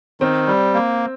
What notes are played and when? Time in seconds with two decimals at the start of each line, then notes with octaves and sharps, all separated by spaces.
0.21 D#3 C4
0.47 G3
0.74 A#3